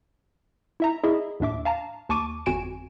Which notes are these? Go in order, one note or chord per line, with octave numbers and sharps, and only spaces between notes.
E4 E5 A#5
E4 G#4 D#5 E5
D#2 A2 D4 E5 D6
F5 A5 A#5
D#2 A5 C#6 D6 D#7
G1 F2 F#4 G#5 D7 E7